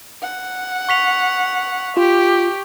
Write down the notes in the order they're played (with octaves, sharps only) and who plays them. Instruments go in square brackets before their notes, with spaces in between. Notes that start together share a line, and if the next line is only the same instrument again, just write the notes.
[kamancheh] F#5
[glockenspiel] C#6 B6 F7
[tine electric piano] F4 [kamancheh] G4